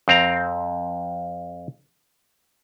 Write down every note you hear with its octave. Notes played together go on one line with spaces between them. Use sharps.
F2 C4 A#5